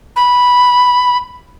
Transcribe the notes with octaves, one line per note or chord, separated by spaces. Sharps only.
B5